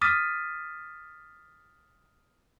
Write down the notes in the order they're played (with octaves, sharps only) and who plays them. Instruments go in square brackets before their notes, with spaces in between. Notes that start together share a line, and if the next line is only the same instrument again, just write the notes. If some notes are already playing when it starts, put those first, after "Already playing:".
[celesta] D6 D#6 F6 A6 B6 D#7